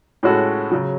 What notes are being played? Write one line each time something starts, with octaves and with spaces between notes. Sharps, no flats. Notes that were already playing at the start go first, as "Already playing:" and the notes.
A2 G#3 C#4 F#4 A4
C#3 F#3